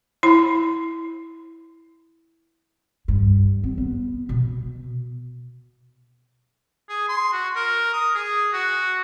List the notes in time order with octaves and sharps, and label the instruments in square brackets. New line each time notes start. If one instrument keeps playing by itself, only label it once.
[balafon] E4 B5
[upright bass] G2
C4
B3
B2
[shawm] G#4
C6
F#4
A#4
D#6
G#4
F#4